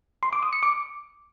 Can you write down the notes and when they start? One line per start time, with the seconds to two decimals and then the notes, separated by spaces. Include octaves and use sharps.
0.23 C6
0.33 D6
0.43 D#6
0.53 C#7
0.63 D6